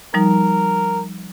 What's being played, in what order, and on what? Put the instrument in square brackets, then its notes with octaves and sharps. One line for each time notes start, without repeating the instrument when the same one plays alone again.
[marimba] F3 G3 D#4 [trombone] A#4